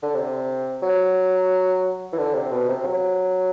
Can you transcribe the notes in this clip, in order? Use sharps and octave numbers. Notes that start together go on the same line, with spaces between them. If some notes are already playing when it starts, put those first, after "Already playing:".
D3
C3
F#3
E3
D3
C3
B2
C3
F#3